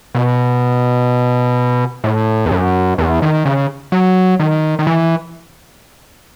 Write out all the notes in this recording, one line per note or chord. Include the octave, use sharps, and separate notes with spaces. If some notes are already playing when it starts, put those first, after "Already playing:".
B2
A2
E2
F#2
E2
D#3
C#3
F#3
D#3
D#3
E3